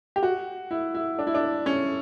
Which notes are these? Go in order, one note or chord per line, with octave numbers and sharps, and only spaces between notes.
G4
F#4
E4
E4
D4
E4
D4
C#4